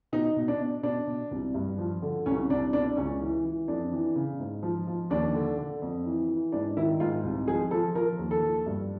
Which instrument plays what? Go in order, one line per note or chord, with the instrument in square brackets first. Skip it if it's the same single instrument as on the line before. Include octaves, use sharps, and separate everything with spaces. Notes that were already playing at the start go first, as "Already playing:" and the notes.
[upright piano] B2 D#4
B2
D4
B2
B2 D4
B2
C2
G2
F3
D3
C2 C#4
C2 D4
B2 D4
C#2 C#4
E3
E3
F2 D4
E3
C#3
G#2
F3
F3
D#2 D4
D3
D3
F2
E3
E3
G#2 D4
D#3 E4
G#2 F4
C2
F3 G#4
F3 A4
F3 A#4
D#2
A4
F3
G2